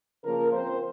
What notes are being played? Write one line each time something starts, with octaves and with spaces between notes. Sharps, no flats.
C#3 F3 A#3 A#4
F3 C4 C5